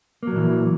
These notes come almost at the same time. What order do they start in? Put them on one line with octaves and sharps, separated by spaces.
A#3 F#3 A#2 E3